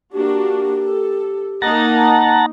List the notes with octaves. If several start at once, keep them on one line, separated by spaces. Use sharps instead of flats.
A#3 D4 F#4 G4
A4
A#3 D#4 D#5 F#5 A5 A#5